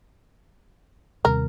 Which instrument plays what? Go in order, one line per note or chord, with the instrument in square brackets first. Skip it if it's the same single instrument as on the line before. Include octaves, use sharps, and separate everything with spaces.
[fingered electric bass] D#2 C3 G3 [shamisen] A#4